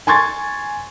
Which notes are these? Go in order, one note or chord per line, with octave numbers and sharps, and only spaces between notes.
G#5 C6 C#6 G#6 A6